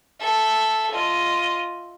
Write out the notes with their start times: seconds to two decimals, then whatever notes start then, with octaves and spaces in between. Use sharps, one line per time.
0.21 A4 E5
0.91 F4 D#5